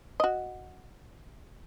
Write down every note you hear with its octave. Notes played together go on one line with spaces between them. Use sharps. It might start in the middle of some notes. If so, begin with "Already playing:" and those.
F#4 D#5